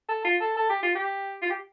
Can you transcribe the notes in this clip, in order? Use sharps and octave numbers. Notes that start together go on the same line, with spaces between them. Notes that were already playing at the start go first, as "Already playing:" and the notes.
A4
F4
A4
A4
G4
F4
G4
F4
G4